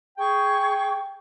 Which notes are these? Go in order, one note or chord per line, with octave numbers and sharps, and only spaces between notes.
G#4 G5 C#6